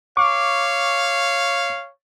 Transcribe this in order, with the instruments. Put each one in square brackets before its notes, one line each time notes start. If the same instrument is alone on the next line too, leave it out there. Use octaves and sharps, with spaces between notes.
[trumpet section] C#5 F5 [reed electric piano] C#6 D6